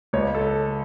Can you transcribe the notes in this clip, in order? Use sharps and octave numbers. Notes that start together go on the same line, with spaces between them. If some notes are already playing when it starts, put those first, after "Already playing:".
C#2 C#5
A4